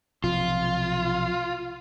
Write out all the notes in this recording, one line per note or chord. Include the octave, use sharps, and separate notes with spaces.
B1 C3 F3 F4